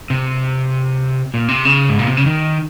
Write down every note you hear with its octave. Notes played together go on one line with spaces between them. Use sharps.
C3
A#2
C3
C#3
G#2
A#2
C3
C#3
D#3